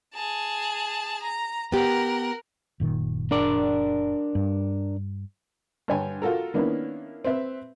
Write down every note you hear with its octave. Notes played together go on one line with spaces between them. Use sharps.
G#4 A5
A#5
B3 G4 A#4 F#5
F#1 A#2 D#3
D4 A#4 D5
G2
G2 D3 C#5 G5 G#5
F4 F#4 A4 A#4
D#3 A#3 B3 C#4 D4 E4
C4 B4 E5